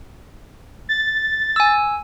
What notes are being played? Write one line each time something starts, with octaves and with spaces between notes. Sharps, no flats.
A6
G#5 E6